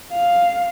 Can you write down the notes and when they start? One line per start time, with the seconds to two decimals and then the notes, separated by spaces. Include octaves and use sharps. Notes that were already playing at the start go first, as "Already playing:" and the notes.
0.12 F5